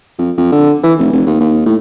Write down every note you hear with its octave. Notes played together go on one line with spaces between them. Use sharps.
F2
F2
D3
E3
F1
F1
D#2
D#2
A2